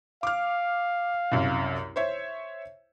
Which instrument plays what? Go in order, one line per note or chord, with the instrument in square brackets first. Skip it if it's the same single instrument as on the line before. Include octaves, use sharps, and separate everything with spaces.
[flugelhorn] F5 [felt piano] D6 F6
[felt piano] C2 F#2
C5 C#5 E5